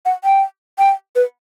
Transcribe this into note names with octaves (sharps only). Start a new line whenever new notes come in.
F#5
G5
G5
B4